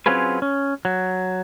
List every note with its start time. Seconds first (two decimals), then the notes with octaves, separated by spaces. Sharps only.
0.06 F#3 C4 C#4 F4 G#4 B4
0.42 C#4
0.85 F#3